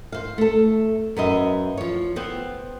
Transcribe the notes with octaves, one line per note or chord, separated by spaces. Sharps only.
C5 F5
A3 A4
F#2 B4 D#5 E5
F3 C#5
B3 C4 C5